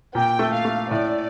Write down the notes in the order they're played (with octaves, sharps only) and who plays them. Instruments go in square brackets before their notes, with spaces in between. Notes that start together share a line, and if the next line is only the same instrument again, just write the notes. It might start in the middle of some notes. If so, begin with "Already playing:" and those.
[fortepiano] A#2 [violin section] G5
[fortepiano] A3
[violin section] F5
[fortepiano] A3
[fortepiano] A2 [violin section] D5